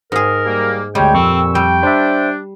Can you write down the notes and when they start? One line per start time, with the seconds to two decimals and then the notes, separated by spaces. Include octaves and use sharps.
0.12 G#2 G#4 A#4
0.45 G3 A#3
0.95 D2 G3 G#3 G4 C#5 G5
1.14 F2 A#2 C4 C#6 E6
1.55 G3 G5
1.83 D4 C5 E5